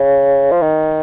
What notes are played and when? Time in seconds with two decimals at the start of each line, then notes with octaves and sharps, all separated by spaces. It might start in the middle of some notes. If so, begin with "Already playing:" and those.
Already playing: C#3
0.51 F3
0.62 D#3